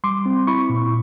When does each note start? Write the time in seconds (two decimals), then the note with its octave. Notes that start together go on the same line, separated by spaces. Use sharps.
0.04 G3 C6 D6
0.26 C4
0.47 E4 B5 C#6
0.70 A#2